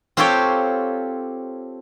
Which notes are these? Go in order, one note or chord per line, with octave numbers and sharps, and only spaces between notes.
C4 F4 G4 A4 C#5 G5